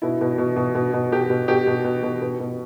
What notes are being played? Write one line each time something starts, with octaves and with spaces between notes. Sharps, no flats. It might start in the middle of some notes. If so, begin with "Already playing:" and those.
B2 E4
B2
B2
B2
B2
B2
B2 G4
B2
B2 G4
B2
B2
B2
B2
B2